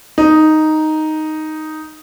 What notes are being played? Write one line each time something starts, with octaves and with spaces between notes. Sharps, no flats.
D#4